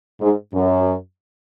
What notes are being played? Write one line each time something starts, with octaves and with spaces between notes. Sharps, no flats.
G#2
F#2